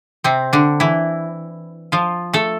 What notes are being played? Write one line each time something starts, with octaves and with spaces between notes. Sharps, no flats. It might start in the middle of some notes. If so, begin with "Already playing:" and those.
C3 C4
D3 D4
E3 E4
F3 F4
A3 A4